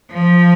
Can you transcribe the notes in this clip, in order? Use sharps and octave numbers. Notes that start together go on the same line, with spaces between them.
F3